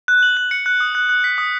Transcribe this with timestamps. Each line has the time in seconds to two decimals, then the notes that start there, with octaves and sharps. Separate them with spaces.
0.08 F#6
0.23 F#7
0.37 F#6
0.51 C#7
0.66 F#6
0.80 D#6
0.95 F#6
1.09 F#6
1.24 B6
1.38 D#6